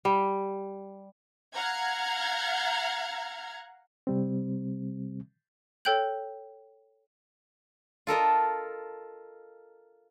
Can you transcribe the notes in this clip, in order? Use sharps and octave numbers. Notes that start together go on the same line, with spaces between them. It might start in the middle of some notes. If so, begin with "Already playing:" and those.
G3
F5 F#5 A#5 F6 G#6
C3 G3 C4
A4 C#5 G5 F#6 G6 F#7
F4 A4 A#4 D#5